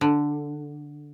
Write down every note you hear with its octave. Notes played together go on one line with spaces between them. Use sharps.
D3